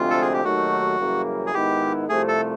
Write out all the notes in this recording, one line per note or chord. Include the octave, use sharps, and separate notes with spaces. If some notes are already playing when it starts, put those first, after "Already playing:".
Already playing: D2 C3 F3 G#3 C4 F4
A4
G#4
G4
D#2 D#3 F#3 A3 F#4
F#2 C#3 E3 G3 A#3
G#4
G#2 D#3 G#3 B3 E4 G4
C2 C3 F3 A3 G#4
A4